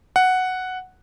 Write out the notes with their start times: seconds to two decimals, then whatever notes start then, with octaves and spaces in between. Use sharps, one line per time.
0.16 F#5